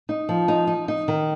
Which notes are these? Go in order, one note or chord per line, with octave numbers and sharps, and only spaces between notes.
D#4
F3
D#4
D#4
D#4
D#3